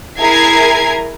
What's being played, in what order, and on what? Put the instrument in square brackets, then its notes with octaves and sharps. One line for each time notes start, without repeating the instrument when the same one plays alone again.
[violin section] E4 G#4 A#4 A#5 G#6 C7